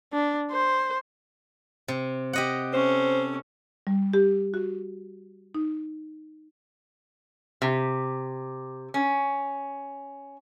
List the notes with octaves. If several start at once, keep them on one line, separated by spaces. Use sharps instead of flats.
D4
C5
C3
G4 D#5 F#5
C#4 A4 C5
G3
G4
F#4
D#4
C3
C#4